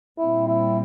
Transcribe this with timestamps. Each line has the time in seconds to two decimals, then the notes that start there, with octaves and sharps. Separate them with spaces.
0.18 A#2 G3 C4 E4
0.48 E4